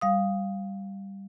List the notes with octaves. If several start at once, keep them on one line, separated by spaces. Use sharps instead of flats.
G3 F5 D#6